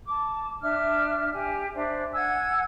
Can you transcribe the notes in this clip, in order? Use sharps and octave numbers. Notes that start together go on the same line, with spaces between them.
A5 D6
D4 E5 F6
G4 G#5
D4 C5 D5 E5
F#5 G#5 E6 G#6